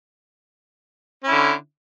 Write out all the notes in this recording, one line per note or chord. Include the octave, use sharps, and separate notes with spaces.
D3 C#4 E4